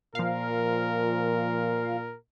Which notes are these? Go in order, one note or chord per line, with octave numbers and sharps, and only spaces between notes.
A#2 F3 A#4 F5